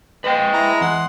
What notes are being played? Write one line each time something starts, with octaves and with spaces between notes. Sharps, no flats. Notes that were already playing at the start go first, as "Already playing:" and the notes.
G#3 B4 C5 G5
E4 A#5
E2 F#5 C6